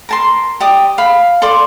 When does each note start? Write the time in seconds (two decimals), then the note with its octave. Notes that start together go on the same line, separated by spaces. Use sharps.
0.09 A#4 A5 C6
0.60 G4 D5 D#6
0.98 F5 B5
1.42 A4 D5 C6 D6